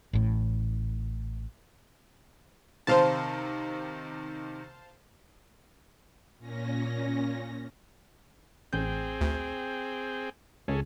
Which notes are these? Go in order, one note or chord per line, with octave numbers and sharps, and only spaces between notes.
A1 A2
C3 D#3 C4 C5 F5 A5
A#2 C#4 A#6
A1 C4 G#4 G5 G6
D2
C#2 C#3 C#4 G#4 A4